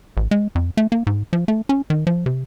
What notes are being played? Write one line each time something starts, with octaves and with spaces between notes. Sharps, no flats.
A1
G#3
F2
A3
A#3
G#2
F3
A3
C#4
D#3
F3
C3